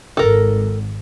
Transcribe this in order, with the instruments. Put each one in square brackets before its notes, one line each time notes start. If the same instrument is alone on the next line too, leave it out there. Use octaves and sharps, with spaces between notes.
[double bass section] G#1 [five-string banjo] A4 A#4